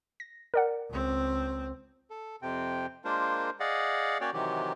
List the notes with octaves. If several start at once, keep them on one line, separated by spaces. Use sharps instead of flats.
A#6
A#4 D5 F#5
C#2 C4
A4
F2 C3 G5
G#3 A#3 D4 F4 A#4 C5
G#4 D5 D#5 F5 F#5
A#3 C#4 F#4 C#5 D5 G5
C3 D#3 E3 F#3 G4